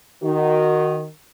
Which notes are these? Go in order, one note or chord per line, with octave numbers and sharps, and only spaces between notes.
D#3 F#4